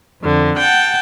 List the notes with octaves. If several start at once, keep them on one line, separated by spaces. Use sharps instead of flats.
F2 D3
F#5 G5 A5